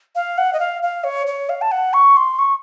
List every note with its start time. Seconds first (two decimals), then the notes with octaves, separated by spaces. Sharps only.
0.15 F5
0.38 F#5
0.53 D#5
0.60 F5
0.83 F5
1.04 C#5
1.27 C#5
1.49 F5
1.61 A5
1.71 F#5
1.93 C#6
2.17 C6
2.39 C#6